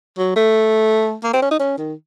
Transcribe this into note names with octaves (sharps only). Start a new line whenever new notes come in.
F#3
A3
A#3
C4
C#4
D#4
C#4
D#3